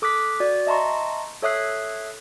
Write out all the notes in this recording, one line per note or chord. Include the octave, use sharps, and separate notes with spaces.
A4 D6 D#6 F#6 B6
F#4 D5
D#5 E5 A5 A#5 C6 C#6
A4 C#5 E5 D#6 F#6 C7